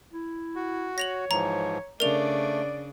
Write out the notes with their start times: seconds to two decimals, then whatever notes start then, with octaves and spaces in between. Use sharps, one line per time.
0.13 E4
0.56 F#4
0.98 C#5 A#6 F7 F#7
1.31 G#2 E3 F3 A#5
2.00 C#3 A3 D4 A#4 D5 F7